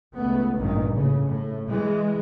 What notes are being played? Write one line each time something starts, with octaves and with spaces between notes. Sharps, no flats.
C#2 A3 B3
A1 G2 A#2 D#3
A2 C#3
A2
E3 G#3